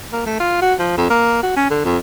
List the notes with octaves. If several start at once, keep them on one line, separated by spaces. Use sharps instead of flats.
A#3
A3
F4
F#4
F3
F2
A#3
F#4
C#4
D3
F2